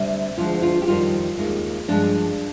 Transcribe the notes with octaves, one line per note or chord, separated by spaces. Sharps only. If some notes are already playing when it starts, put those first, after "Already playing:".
Already playing: D2 C3 G3
D2 D3 F3 G#3 F4
F4
G4
F2 D#3 G3 F4
D#2 D#3 G#3
G2 F3 G#3 D4